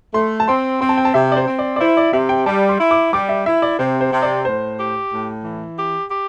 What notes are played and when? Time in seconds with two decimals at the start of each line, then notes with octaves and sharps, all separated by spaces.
0.14 A3 C6
0.40 A5
0.48 C4 C6
0.81 C4 C6
0.89 A5
0.97 G5
1.05 A5
1.14 C3 E5
1.32 D5
1.37 C5
1.47 C4
1.59 D5
1.76 D5
1.80 E4 C5
1.97 D5
2.13 C3 E5
2.29 G5
2.46 G3 A5
2.69 C6
2.80 E4
2.91 D6
3.13 G3 D6
3.29 E5
3.46 E4 E5
3.62 D5
3.79 C3 C5
4.01 C5
4.12 C3
4.22 D5
4.45 A2 C5
4.78 G4
5.10 A2
5.44 E3
5.78 G4
6.10 G4